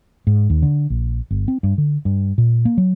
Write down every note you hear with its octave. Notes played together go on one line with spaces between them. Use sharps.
G#2
D#2
D3
A#1
G1
C4
G2
D3
G2
A#2
A#3
F#3